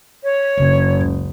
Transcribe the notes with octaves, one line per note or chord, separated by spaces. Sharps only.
C#5
F#1 C#3 D4
C#2